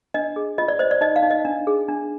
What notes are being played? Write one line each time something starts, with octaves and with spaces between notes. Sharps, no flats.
D4 D#5
G#4
F4 D#5
D5
C5 D#5
D5
D#4 D#5
F5
D#4
D#5
D4
G#4
D4